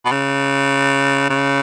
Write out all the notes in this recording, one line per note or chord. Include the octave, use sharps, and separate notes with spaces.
B2
C#3
C#3